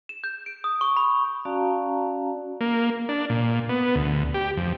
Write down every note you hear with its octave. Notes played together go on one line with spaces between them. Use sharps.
E7
G6
D7
D#6
C#6
B5
C#4 F#4 D5 F5 A5 A#5
A#3
D4
A#2
B3
D2
G4
F2